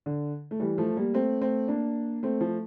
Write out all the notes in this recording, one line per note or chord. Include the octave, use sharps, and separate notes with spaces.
D3
A3
E3 G3
F3 A3
G3 A#3
A3 C4
A3 C4
A#3 D4
A3 C4
F3 A3